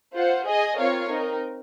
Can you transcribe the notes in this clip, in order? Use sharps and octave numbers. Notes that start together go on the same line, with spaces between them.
F4 C5 F#5
G#4 D#5 G#5
C4 F4 A#4 C#5 F5
C4 D#4 A#4